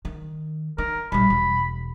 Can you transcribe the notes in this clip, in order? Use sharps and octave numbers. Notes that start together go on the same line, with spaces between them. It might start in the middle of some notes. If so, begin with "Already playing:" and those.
D#3
D#4 A#4
A#1 G3 B5
E1